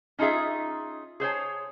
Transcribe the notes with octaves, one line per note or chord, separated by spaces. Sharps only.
C#4 D#4 F4 G#4 E5
G#4 C5 C#5 G#5